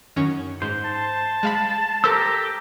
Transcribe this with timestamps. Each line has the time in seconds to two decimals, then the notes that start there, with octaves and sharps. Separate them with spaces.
0.16 F#2 D#3 C#4
0.62 G#2 C5
0.85 A5
1.43 G#3 F5 B5
2.04 G4 A4 A#4 C5 A#5 E6